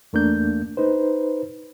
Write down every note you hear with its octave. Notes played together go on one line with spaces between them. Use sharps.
E2 A3 A#3 D4 G6
D#4 B4 C5